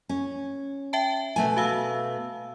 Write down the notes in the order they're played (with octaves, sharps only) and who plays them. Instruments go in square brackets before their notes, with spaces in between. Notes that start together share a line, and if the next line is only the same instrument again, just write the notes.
[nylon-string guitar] C#4
[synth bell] E5 G5 A5
[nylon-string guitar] B2 A3 G#5
[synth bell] F#4 F5 E6